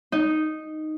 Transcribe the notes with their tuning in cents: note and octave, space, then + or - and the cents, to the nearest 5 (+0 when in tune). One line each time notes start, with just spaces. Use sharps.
D#4 -5